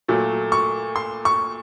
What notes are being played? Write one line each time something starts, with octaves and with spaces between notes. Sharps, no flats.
A#2 F#3 A3
C#6
C6
C#6